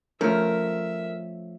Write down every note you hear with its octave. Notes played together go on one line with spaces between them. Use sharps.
F3 A3 C#4 A#4 E5